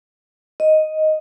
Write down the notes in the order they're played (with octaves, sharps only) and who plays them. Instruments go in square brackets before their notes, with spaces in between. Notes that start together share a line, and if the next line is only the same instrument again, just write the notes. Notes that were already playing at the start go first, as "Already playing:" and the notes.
[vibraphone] D#5